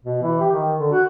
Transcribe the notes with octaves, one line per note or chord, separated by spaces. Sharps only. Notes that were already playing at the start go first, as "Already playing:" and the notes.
B2
E3
G4
D#3
D3
F#4